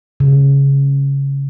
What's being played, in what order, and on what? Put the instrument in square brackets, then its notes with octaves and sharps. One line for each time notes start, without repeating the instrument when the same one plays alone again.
[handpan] C#3